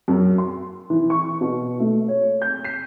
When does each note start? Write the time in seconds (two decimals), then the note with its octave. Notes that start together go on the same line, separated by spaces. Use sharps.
0.08 F#2
0.38 C6
0.90 E3
1.10 C#6
1.41 B2
1.80 A3
2.08 C#5
2.42 G6
2.64 C7